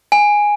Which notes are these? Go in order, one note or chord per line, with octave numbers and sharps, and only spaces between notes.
G#5